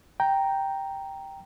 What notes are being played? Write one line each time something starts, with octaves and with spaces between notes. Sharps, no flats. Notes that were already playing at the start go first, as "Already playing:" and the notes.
G5 A#5